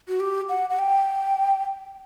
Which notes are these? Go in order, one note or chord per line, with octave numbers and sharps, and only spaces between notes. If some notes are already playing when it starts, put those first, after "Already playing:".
F#4
G4
F#5
F#5
G5